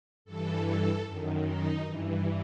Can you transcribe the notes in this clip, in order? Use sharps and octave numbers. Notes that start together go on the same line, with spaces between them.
G2 E3 A4
A4
F#2 D#3
D#4
G2 E3